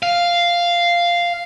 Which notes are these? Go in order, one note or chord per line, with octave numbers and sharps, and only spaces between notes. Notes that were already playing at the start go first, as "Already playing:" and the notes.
F5